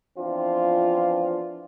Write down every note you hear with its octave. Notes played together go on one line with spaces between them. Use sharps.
E3 F3 B3 C4 D4 F4